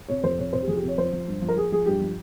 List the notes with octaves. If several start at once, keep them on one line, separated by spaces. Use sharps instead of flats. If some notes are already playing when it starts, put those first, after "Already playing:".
C3 C#5
F2 C5
C3 C#5
C3 C5
G4
F2 G#4
G4
C3
C#5
F3 C5
F3
G2
F3
A#4
F3 G#4
F3 G#4
G2 G4
F3